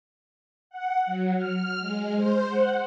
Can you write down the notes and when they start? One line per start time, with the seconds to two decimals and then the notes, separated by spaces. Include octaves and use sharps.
0.70 F#5
1.06 F#3
1.36 F6
1.79 G#3
2.15 C5
2.49 F#5